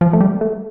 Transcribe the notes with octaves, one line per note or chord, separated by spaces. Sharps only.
F3
A3
G3
A3